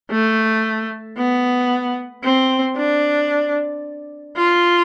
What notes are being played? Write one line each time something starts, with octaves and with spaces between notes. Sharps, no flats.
A3
B3
C4
D4
F4